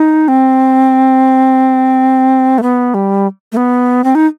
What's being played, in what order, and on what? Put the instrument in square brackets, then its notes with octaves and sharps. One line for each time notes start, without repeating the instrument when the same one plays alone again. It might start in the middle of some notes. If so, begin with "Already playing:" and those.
Already playing: [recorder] D#4
C4
A3
B3
G3
A3
B3
C4
D#4